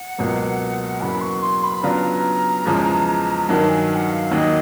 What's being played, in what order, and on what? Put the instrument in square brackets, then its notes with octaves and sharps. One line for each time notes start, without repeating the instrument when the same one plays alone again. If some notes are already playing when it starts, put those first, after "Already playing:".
Already playing: [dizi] F#5
[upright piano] C#2 B2 F#3 A#3
[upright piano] E2 C#3 F#3 A#3 [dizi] B5
[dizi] C#6
C6
B5
[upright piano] C#3 F#3 B3 D4 F4 [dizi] A#5
[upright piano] E2 C#3 F3 G#3
[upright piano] G2 D#3 F#3 [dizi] A5
[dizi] G#5
G#5
F#5
F5
[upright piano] D#2 D#3 F#3 A#3 D#4 [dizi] D#5